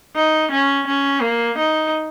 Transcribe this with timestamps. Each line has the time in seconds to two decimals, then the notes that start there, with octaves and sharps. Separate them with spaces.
0.15 D#4
0.51 C#4
0.87 C#4
1.21 A#3
1.57 D#4